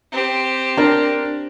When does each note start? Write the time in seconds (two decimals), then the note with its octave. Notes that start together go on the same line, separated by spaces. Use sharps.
0.12 C4 G4
0.77 D4 A#4